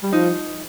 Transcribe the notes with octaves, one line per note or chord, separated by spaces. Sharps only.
G3
F3 D#4